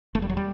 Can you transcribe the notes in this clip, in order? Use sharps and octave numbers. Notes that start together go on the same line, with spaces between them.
E1 A3
G3
F#3
G3